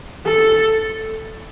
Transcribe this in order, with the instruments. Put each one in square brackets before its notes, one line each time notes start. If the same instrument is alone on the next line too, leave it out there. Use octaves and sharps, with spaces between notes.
[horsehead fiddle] A4